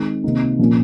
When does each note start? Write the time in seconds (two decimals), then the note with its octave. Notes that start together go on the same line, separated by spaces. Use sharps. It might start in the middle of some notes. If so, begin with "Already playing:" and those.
Already playing: D#3 G#3 C4
0.24 C3 D#3 A#3 D#4
0.59 A#2 F3 A#3 C#4